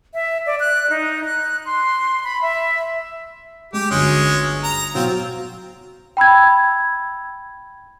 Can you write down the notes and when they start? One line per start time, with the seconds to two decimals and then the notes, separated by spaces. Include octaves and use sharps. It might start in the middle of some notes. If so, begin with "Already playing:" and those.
0.14 E5
0.46 D5
0.60 F#6
0.90 D#4
1.25 F#6
1.66 C6
2.24 B5
2.42 E5
3.73 G#3 G4
3.91 G1 D2 G#3 C#4
4.63 A#5
4.95 B2 F#3 C4 F4 F#4
6.17 G5 B5 E6 G#6